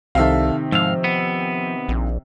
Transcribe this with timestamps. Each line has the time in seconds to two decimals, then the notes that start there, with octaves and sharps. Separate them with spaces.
0.15 C2 C3 D#3 A4 E5 F5
0.72 G#2 F3 F5 E6
1.04 B3
1.89 A#1